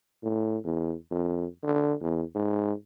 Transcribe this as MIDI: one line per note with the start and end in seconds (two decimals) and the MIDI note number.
0.23 0.58 45
0.64 0.95 40
1.11 1.46 41
1.63 1.94 50
2.01 2.23 40
2.35 2.73 44